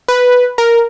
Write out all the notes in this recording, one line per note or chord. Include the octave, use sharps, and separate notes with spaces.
B4
A#4